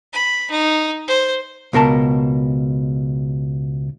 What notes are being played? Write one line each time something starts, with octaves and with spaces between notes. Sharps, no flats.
B5
D#4
C5
C#2 B2 A#4 A5